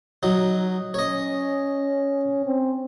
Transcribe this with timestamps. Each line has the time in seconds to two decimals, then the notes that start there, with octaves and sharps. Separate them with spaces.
0.23 F#3 D#4
0.94 C#4 C#5 D#5
2.46 C4